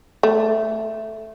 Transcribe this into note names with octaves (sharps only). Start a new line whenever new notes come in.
A3